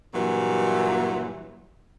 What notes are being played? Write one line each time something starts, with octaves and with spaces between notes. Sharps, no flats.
G2 A#2 E3 F#3